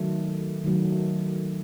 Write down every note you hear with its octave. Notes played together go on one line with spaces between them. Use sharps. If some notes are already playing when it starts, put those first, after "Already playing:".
Already playing: D#3 F#3 A3
D#3 F#3 A3